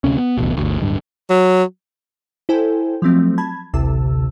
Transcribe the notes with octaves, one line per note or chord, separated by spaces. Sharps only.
D2 C3 C#4
B3
D1 A1 B2
G1 D2
D1 G2
F#3
E4 A4 C5 G5 G#5
F3 F#3 A3 C4
A5 B5 G#6
A1 D2 C3 A5 E6